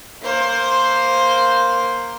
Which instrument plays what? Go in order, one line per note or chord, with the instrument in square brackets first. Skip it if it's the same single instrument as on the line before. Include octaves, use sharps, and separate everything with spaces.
[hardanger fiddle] A#3 C5